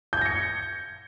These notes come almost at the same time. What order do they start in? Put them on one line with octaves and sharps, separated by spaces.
G6 G#6 A#6 C#7